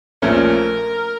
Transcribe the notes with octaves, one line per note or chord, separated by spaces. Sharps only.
A#1 A#2 F3 A3 C#4 A#4